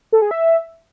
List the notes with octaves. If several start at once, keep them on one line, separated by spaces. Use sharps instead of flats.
A4
G#4
E5